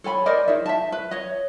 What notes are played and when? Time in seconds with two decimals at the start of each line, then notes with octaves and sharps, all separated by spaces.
0.04 A4 C#5 G#5 B5
0.26 A#4 C5 D5 D#5
0.48 D#4 G#4 E5
0.66 E5 A5
0.92 B4
1.11 C#5 D#5